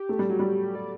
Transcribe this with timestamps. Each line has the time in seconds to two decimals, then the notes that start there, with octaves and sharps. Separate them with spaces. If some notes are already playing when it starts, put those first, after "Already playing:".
Already playing: G4
0.09 A3
0.19 G3
0.29 F#3
0.39 G3
0.75 D5